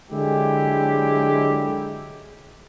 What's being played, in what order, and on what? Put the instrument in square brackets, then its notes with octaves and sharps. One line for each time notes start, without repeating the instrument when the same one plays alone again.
[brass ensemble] D3 F#3 G#3 E4 G4